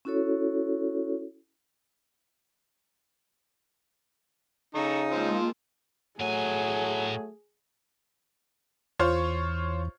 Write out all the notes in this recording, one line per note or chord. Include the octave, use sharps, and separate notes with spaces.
C#4 E4 F#4 A4 C#5
C#3 D#4 A4 A#5 C#6
F3 G#3 A#3 C4 F4
A2 F#3 A3 G#4 G#5
E2 F4 C5 C#5